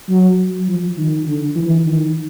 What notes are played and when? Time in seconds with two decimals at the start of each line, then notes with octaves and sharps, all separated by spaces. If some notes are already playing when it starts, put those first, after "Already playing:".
0.09 F#3
0.68 F3
0.98 D#3
1.27 D3
1.56 E3
1.86 D#3